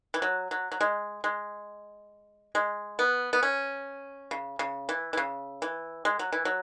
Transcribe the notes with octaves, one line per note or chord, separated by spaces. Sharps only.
E3
F#3
F#3
F#3
G#3
G#3
G#3
B3
B3
C#4
C#3
C#3
E3
E3
C#3
E3
G#3
F#3
E3
F#3